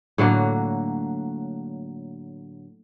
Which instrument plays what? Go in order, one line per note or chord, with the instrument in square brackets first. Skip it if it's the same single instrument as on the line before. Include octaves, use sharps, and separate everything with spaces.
[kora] A2 D3 F#3 A#3